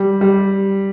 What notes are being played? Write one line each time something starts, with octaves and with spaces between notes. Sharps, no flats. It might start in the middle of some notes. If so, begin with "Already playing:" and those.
Already playing: G3
G3